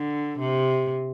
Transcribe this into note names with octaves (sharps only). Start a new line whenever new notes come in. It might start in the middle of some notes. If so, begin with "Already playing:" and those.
Already playing: D3
C3